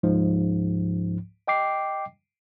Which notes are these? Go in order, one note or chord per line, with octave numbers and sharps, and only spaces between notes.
C#2 G#2 F3
D#5 G5 D6 C7